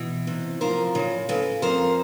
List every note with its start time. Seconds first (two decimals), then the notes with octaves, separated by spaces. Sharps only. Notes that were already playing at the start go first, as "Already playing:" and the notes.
Already playing: B2 E3
0.27 C3
0.61 F3 A#4 C5
0.95 C#3
1.29 C#3 A4 B4
1.62 F2 A#4 C5